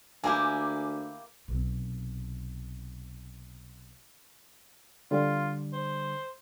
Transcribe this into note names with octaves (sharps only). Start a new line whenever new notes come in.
D2 A#3 E4 G4 G#5 D6
B1 C3
D3 G3 F4
C5